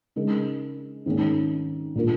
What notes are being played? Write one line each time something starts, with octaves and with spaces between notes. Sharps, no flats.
C#3 G#3 D#4 A#4
G#2 D#3 A#3 C#4
A#2 A#3 F4 A#4